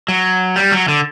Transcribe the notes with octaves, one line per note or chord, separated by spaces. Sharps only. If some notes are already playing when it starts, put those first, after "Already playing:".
F#3
G3
F#3
D3